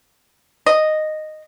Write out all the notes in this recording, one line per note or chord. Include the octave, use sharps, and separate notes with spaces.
D#5